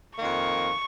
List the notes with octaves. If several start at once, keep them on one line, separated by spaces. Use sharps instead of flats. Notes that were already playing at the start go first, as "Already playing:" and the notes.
F2 D#3 A#3 C#6